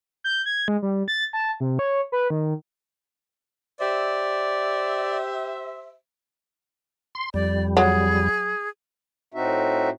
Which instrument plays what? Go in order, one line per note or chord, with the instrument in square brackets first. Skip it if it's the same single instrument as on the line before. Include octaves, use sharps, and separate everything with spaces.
[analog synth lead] G6
G#6
G#3
G3
A6
A5
C3
C#5
B4
D#3
[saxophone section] G4 C5 E5 [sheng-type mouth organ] D5
[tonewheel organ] C6
[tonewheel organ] F2 G3 [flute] D5
[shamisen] F#3 [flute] G#4
[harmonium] A2 C4 D#4 F#4 E5